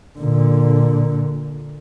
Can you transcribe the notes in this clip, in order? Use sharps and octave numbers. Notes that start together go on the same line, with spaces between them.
A#2 D3